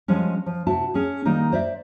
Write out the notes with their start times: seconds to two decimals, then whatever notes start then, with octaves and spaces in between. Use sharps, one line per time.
0.08 F3 G3 G#3 C#4
0.46 F3
0.67 C3 E4 F#4 A5
0.94 C#4 G#4
1.25 D#3 G3 A#3 D#4
1.52 C5 D5 E5